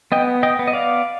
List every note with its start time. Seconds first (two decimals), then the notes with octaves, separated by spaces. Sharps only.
0.12 B3 D#5 G5
0.43 D#5 G5
0.59 B3
0.68 D#5
0.73 D5 F5